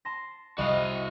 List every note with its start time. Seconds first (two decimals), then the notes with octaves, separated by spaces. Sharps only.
0.05 A5 C6 A#6
0.58 C2 F#4 D#5 F5